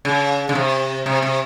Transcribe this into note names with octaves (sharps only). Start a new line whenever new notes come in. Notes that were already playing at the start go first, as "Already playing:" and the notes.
C#3
C#3
C3
C3
C3